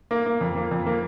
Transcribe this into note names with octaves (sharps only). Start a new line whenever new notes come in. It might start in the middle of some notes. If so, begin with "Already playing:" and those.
A#3
A#3
F2
A#3
F2
A#3